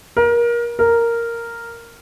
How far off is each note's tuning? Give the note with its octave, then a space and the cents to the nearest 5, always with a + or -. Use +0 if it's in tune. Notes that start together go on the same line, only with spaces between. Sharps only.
A#4 +25
A#4 -5